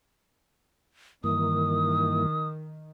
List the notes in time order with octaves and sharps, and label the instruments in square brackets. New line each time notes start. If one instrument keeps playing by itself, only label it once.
[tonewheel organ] G2 E3 A#3 [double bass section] D#3 [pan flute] D#6